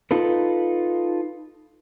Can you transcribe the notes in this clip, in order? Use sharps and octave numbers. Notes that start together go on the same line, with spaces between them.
D#4 F4 A4 B4